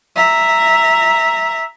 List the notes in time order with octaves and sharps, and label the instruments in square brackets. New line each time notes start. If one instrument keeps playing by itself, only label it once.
[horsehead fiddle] E5 A#5